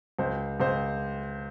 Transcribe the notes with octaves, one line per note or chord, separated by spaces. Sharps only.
C#2 C5
C#2 C5